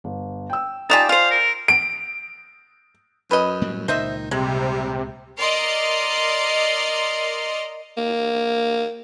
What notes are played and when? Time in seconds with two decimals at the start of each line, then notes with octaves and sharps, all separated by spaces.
0.04 G1
0.50 G5 E6
0.90 D#4 F4 G4 D5 G#5 A5
1.09 F4 C5 F5
1.31 A#4
1.68 D7
3.31 F#2 B4 D#5
3.62 A2 G3 A#3
3.88 C#2 A#2 D#3 C5 D#5 E5
4.31 C3 G3 G#3
5.39 A#4 D5 D#5 C6 F6
7.97 A#3